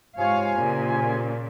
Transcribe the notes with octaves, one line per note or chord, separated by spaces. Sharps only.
G#2 C3 F4 C#5 F5 G#5
A#2 C#3